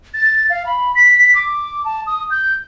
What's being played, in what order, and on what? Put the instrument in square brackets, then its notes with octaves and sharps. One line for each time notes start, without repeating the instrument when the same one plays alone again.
[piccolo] A6
F5
B5
B6
B6
D6
A5
D#6
G6